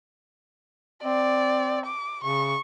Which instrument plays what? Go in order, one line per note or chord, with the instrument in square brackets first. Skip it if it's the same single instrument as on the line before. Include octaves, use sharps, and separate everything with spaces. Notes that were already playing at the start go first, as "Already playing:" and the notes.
[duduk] C4 [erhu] D5
[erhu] D6
[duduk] C#3 [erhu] C#6